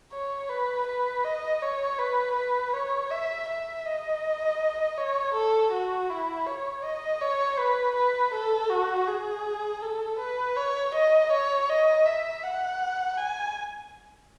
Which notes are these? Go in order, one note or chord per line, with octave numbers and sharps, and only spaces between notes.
C#5
B4
B4
D#5
C#5
B4
B4
C#5
E5
E5
D#5
C#5
A4
F#4
E4
C#5
D#5
C#5
B4
B4
A4
F#4
G#4
A4
B4
C#5
D#5
C#5
D#5
E5
F#5
G#5